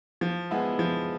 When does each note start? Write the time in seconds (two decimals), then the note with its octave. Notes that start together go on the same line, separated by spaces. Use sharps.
0.21 F3
0.51 G#3 B3 E4
0.79 F3